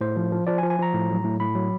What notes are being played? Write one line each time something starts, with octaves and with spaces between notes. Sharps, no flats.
A2 C5
F3
F3
F3 D5
G#5
F3
G#5
F3 A#5
A2
F#3
A2
A2 B5
F#3